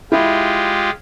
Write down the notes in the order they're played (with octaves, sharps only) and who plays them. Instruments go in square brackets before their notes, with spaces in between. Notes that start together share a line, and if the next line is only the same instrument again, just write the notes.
[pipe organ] G#3 F4 G4 [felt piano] E4